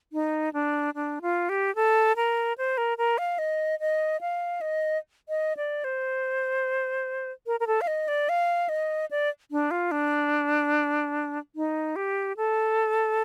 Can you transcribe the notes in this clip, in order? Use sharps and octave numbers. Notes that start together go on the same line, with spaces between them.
D#4
D4
D4
F4
G4
A4
A#4
C5
A#4
A#4
F5
D#5
D#5
F5
D#5
D#5
D5
C5
A#4
A#4
A4
F5
D#5
D5
F5
D#5
D5
D4
F4
D4
D#4
G4
A4